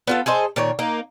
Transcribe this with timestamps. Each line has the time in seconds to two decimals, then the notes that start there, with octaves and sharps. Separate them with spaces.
0.07 B3 F4 A4
0.26 G#4 A4 C5 D#5
0.56 A#2 D#3 C#5
0.79 A#3 D#4